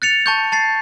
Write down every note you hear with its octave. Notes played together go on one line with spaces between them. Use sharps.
F#6 A6 C#7 F7
A5 C#6 G6
A5 A6 C7